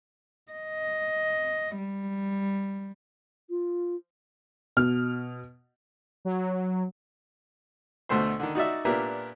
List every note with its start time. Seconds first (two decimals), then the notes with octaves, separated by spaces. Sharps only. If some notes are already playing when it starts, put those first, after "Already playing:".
0.52 D#5
1.78 G3
3.50 F4
4.77 B2 F6
6.25 F#3
8.09 D2 B2 A3 C5 C6
8.40 D3 D#3
8.55 D#4 F#4 D5 E5
8.85 A#2 B3 D4 G4 A#4 E5